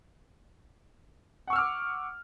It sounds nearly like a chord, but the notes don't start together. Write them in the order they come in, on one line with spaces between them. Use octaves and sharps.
F#5 C#6 E6 F6 D6